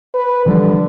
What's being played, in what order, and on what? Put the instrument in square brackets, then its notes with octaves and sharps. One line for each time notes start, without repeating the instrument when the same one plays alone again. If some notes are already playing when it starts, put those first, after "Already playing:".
[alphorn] B4
[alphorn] D3 [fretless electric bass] E3 F3 G3